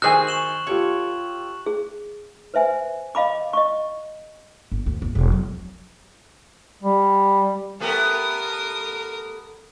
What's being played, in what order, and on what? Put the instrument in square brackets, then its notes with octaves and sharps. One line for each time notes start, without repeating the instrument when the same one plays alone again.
[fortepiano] D#3 C5 E6 [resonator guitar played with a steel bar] F#4 G#4 G#5 [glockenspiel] F#6
[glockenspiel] C#6 E7 F#7
[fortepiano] F4 G4 A4 [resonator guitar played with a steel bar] C#5
[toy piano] G#4
B4 C5 E5 G#5
D#5 F5 B5 D6
D#5 C#6
[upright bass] G1
D2
G1
E1
F#3
[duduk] G3
[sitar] A3 B3 G4 [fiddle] A#4 D#6